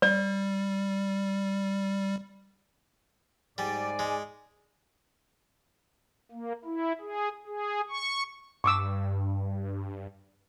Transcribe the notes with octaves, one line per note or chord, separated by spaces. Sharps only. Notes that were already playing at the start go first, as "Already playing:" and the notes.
G3 D5
G#2 G3 D5 G#5
G#3
A#3
E4
G#4
G#4
C#6
G2 C#6 D6 E6